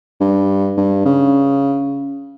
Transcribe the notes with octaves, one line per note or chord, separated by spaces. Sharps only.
G2
G2
C#3